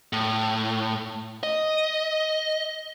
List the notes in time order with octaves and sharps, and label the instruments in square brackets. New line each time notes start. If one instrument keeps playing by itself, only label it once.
[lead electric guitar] A2
D#5